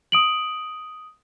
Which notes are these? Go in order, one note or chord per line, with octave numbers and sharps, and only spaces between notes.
D#6 D7 F#7